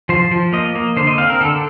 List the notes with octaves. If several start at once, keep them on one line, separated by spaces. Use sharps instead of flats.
F3 C5
F3
A#3 D#5
A#3
D3 C5
D#5
C4 F5
A#4
D3 A4